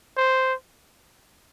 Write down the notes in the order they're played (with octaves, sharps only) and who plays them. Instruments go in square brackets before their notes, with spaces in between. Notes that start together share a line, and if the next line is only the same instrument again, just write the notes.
[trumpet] C5